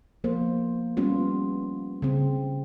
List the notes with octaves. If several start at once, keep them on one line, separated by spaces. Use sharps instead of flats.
F3 A#3 B3 C5
G3 B3 C#4 F4
C#3 C4